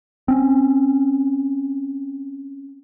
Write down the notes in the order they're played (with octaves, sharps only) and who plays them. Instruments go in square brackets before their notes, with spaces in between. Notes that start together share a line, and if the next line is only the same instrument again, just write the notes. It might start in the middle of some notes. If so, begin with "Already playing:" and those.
[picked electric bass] C4 C#4